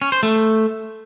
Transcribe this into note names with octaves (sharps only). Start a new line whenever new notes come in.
C#4
C5
A3